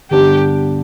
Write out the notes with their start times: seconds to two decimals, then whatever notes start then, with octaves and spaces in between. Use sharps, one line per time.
0.11 G2 D3 G3 B3 D4 G4